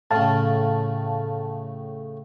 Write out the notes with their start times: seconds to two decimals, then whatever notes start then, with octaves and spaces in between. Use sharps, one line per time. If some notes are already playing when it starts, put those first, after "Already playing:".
0.11 A2 C#3 F5 A5